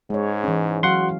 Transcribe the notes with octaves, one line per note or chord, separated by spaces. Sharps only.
G#2 G#3 C#5
E3 C#4
F#3 F#4 F5 F#5 C6